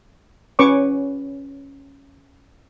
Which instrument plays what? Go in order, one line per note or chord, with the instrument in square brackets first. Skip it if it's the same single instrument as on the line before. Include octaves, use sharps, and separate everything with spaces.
[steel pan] C#4 B4 C#5 C#6 D6